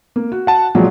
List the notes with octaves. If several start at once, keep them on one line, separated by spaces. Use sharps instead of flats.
A#3
F#4
F#5 A5
A#2 F3 F#3 G#3